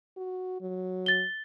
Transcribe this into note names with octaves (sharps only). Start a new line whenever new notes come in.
F#4
F#3
A6 G7